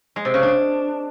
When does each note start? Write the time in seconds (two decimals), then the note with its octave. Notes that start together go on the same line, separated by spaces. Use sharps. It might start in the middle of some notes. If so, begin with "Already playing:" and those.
0.16 G#3
0.25 C3
0.34 C#3
0.43 D4